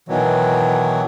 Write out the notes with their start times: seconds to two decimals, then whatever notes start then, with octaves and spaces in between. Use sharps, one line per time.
0.09 B2 D#3 E3 F#3